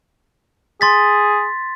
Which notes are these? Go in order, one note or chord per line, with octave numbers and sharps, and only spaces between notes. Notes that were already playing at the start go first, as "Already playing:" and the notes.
G#4 C6 A6 B6